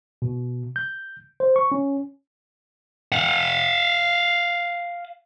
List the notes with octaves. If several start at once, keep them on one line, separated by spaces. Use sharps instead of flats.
B2
G6
C5
C#6
C#4
F5 F#5